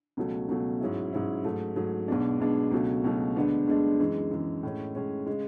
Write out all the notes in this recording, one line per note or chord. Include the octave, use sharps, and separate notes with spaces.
C#2 B2 F#3 A3
C#2 B2 F#3 A3
G#2 F#3 C#4 E4
G#2 F#3 C#4 E4
G#2 F#3 A3
G#2 F#3 A3
B1 B2 G#3 B3 D4
B1 B2 G#3 B3 D4
C#2 B2 F#3 A3
C#2 B2 F#3 A3
D2 D3 G#3 B3 D4
D2 D3 G#3 B3 D4
F#2 E3 G#3
F#2 E3 G#3
A2 G#3 C#4
A2 G#3 C#4
C#3 G#3